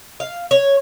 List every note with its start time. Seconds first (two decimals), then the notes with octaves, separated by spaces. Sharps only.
0.20 F5
0.51 C#5